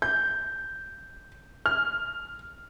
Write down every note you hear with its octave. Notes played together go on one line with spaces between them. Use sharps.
G6
F6